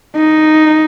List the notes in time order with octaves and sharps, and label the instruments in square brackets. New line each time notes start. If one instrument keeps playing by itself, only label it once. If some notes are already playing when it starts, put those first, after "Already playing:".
[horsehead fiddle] D#4